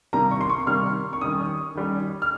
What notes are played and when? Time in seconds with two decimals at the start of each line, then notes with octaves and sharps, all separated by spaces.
0.13 C3 D#3 G3 A#3 A#5
0.31 C#6
0.41 C6
0.50 C#6
0.67 C3 D#3 G3 A#3 F6
1.13 C#6
1.21 D#3 G3 C#4 D#6
1.75 D#3 G3 C#4
2.22 F6